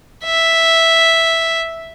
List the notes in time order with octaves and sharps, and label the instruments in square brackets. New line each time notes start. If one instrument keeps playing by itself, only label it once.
[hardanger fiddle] E5